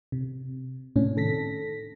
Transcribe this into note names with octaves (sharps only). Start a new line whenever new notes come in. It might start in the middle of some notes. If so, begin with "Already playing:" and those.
C3
A2 C3 C#4 D4
D#3 A4 A#6 B6